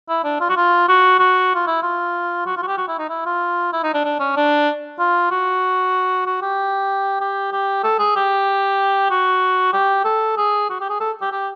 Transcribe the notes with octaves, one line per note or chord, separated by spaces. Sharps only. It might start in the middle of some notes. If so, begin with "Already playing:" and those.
E4
D4
F4
F#4
F4
F#4
F#4
F4
E4
F4
F#4
F4
F#4
G4
F#4
E4
D#4
E4
F4
E4
D#4
D4
D4
C#4
D4
F4
F#4
F#4
G4
G4
G4
A4
G#4
G4
F#4
G4
A4
G#4
F#4
G4
G#4
A4
G4
G4